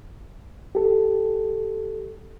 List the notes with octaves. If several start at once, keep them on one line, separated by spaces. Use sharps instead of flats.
G4 A4